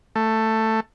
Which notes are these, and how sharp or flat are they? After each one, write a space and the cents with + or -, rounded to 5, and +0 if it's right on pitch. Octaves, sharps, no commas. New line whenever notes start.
A3 +10